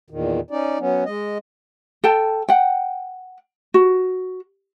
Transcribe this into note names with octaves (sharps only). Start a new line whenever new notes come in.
E2 A#2 D#3
C#4 D#4 D5
F#3 B3 C#4
G#3 D#5
A4 G5 A5
F#5 G5
F#4